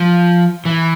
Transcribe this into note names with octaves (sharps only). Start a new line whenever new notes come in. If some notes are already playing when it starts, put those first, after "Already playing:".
Already playing: F3
E3